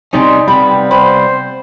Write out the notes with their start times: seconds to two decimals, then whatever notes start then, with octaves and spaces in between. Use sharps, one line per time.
0.13 C3 G3 C#4 D#4 D5 D#5 G#5 C6
0.48 C3 G3 B3 F5 G5 B5
0.91 C5 B5